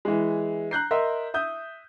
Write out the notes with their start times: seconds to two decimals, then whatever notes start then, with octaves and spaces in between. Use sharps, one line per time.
0.05 E3 G#3
0.71 A#5 F#6 G6 C7
0.91 A#4 D#5 E5 C6
1.34 E5 D#6 G6